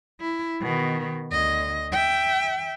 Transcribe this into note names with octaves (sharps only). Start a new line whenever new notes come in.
E4
B2 D#3
D2 D#5
E5 G5